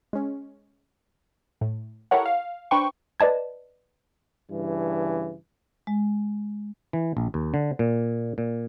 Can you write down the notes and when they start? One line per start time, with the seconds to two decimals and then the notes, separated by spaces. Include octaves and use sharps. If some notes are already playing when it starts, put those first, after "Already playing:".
0.13 G#3 C#4
1.61 A2
2.11 E4 G4 A4 A#4 C#5 F#5
2.26 F5
2.71 D4 B4 C5 G5 C#6
3.20 B4 D5 D#5 A5 G#6
4.51 G2 C#3 E3
5.87 G#3
6.93 E3
7.17 A#1
7.34 D#2
7.54 D3
7.79 A#2
8.38 A#2